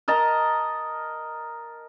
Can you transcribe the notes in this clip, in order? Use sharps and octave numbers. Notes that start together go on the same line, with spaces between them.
A#4 D#5 A5 A#5